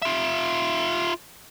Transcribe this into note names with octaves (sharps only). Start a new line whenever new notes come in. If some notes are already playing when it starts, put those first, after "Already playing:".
F4 E5